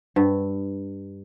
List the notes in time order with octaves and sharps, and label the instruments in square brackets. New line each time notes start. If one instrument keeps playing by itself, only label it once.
[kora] G2